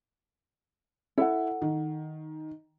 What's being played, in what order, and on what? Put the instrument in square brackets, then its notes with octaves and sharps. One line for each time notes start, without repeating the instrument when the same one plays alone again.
[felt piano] E4 [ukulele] A4 F#5
[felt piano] D#3